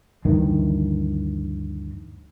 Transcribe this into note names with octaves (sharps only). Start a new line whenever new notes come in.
D2 G2 D#3 E3